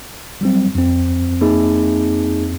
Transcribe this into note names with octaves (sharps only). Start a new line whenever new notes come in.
F#3 G3 C4
F2 C4
A#3 D#4 G#4